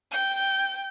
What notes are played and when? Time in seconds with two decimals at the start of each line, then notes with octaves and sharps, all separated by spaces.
0.12 G5 G6